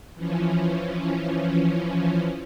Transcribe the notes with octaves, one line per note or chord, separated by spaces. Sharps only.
E3 F3 C#4